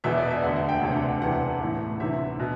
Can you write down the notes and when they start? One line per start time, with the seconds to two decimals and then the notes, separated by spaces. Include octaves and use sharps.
0.04 E1 E2 B2 E5
0.18 D5
0.31 E5
0.42 E1 D2 D3 F#5
0.56 F#5
0.69 G5
0.82 E1 D2 C3 G5
0.92 F#5
1.02 F#5
1.21 E1 E2 C3 E3 F#5
1.60 A1 A2 E3
2.00 D2 C3 E3 E5
2.39 B2